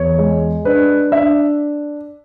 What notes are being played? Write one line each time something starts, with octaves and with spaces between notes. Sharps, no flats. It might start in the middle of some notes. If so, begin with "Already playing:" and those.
Already playing: E2 C#5
G#3
D4 B4
D4 E5